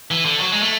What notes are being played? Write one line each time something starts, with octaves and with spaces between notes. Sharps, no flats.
E3
D3
F#3
G#3
A3